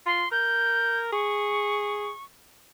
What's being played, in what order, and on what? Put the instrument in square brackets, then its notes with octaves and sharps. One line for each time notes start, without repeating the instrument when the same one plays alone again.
[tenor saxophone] F4 [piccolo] C6
[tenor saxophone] A#4 [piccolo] G6
[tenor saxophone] G#4 [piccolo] C#6